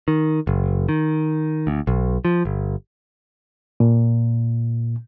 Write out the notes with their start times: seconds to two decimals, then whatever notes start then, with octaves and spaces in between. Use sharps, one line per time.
0.08 D#3
0.47 F#1
0.89 D#3
1.67 D2
1.87 B1
2.25 F3
2.45 G1
3.80 A#2